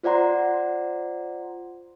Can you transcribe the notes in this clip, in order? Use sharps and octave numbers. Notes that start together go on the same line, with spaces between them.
F4 C5 D5 F#5 A#5 C6